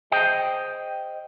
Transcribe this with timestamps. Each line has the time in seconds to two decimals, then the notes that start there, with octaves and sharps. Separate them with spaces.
0.12 G#4 C5 D#5 G5